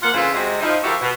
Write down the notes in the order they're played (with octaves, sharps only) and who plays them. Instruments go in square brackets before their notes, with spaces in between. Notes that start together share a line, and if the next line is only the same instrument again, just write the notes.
[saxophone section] F3 A#3 F4 F#5
F2 C#3 E3 F4 C5 E5
C3 G#3 F#4
F3 D#4 E4
F3 E4 F#4 G4 A4 A#4
B2